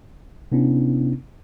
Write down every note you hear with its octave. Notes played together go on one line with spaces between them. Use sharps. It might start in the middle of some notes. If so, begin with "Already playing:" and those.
C3 B3 C#4 D4 E4